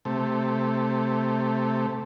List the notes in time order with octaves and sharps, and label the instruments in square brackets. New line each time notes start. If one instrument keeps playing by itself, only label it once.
[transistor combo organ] C3 A3